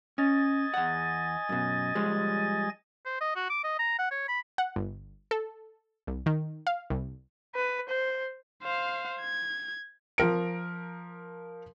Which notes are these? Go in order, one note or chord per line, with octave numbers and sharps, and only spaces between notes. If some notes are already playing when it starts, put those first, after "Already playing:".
C#4 D#5 G#5 A6
E2 F#5
F#2 B2
F3 G3 G#3
C5
D#5
F#4
D6
D#5
A#5
F#5
C#5
B5
F#5
G1
A4
C2
D#3
F5
C2
B4
C5
C5 F5
G#6
F3 A#4 D7